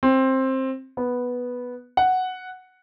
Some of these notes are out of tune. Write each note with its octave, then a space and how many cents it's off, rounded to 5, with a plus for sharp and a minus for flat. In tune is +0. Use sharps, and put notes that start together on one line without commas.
C4 +15
B3 -5
F#5 +0